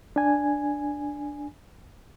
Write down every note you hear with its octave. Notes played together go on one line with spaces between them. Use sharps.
D4 G#5